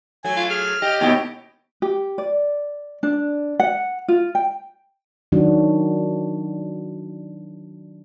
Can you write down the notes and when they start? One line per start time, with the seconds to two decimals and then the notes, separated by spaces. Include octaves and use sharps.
0.24 F#3 A3 G#5
0.37 F4
0.50 G#4 F6
0.82 G4 D#5
1.01 D#2 B2 E4 G4
1.82 G4
2.18 D5
3.03 D4
3.60 F#5
4.08 F4
4.35 G5
5.32 D#3 F#3 D4 F#4